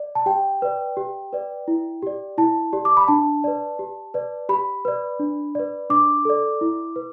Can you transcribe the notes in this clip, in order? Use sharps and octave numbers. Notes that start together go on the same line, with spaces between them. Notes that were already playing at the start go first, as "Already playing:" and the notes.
Already playing: D5
A5
G4 G5
B4 D5
G4
B4 D5
E4
G4 D5
E4 A5
G4 D5
D6
B5
D4 A5
B4 D5
G4
B4 D5
G4 B5
B4 D5
D4
B4 D5
D4 D6
A4 D5
E4
B4